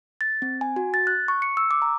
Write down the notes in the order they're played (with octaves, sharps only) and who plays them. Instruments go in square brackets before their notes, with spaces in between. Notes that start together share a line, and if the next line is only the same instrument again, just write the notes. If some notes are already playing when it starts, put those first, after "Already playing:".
[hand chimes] A6
C4
G#5
F#4
A6
F#6
C#6
C#7
E6
D6
A#5